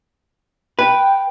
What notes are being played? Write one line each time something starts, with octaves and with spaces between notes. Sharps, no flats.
B4 G5